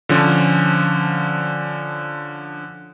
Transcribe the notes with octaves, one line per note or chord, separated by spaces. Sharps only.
D3 F3 C#4